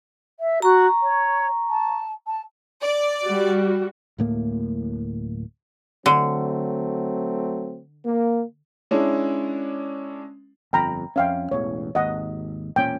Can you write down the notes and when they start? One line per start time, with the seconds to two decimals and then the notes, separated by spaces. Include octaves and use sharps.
0.40 E5
0.62 F#4 A#5 C#6
1.03 C#5
1.70 A5
2.27 A5
2.81 D5
3.24 G3 F#4
4.18 D1 A2 A#3
6.06 D3 F#3 A3 C4
8.06 A#3
8.91 G#3 C#4 D4 E4
10.73 G1 F2 G5 A#5 B5
11.16 F2 C#4 E5 F5 G5
11.51 E1 A1 E2 C#5
11.95 G#1 D#2 D#5 F#5
12.76 E1 A#2 C#4 G5